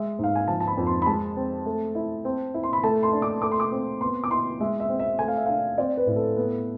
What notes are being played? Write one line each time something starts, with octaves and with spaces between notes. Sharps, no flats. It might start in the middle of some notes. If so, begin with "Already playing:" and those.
Already playing: G#3 E5
G#2 F5
G#5
F3 A5
A5
B5
F2
C6
B5
G#3 A5
C4
A3
E4
C4
E4
C6
B5
A3 A5
C6
D4
D6
A3 D6
C6
D6
C4
B3 C6
D6
E4 C6
G#3 E5
E5
C4
E5
A3 G#5
F5
E5
D4 F5
C4 D5
B4
A2
A4
B3